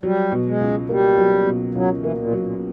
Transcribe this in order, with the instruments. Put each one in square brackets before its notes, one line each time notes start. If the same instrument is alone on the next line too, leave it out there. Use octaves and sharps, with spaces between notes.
[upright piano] F#3 [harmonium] G3
[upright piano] B2
[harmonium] G#3
[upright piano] C#2
[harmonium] G3 [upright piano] A#3
[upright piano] F#3
B2
[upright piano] C#2 [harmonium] F#3
[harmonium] E3
[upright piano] A#3
[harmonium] A#2
[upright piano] F#3
[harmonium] A#2